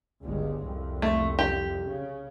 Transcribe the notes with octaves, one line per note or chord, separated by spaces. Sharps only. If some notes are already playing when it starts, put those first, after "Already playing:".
G1 C#2 G#3
C2 F2
A3
G4
C#3